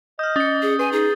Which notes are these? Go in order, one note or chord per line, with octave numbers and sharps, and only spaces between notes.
D#5 D#6 F6 G6
C#4 D#6 A6 C#7 G7
G#4
B4 G#5
D#4 G#4